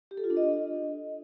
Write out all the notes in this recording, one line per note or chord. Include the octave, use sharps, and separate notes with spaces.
G4
A4
F4
D4
D#5